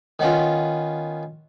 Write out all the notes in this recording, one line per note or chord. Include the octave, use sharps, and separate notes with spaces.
D#3 B3 C#4 F4